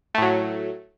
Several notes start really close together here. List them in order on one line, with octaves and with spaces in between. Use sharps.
A3 A2 F#3